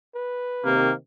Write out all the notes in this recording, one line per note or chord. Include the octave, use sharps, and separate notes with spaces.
B4
C3 D#3 A#3